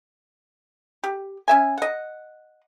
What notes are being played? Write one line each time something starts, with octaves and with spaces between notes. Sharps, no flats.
G4
C#4 E5 G#5
D#5 F#5